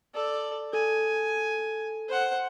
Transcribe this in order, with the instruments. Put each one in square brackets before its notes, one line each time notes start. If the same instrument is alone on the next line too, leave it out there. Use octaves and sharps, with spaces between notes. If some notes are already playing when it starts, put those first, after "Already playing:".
[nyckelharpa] A4 D5
[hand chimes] A4 [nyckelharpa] G#5
[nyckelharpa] C5 F#5